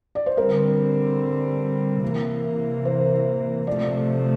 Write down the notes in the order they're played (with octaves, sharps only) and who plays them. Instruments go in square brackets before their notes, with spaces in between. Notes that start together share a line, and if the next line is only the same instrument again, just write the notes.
[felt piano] D5
C5
[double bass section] D3 G3 C4 [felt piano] A#4
[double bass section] C3 E3 A#3
[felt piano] C5
[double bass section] C3 F3 A3 [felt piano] D5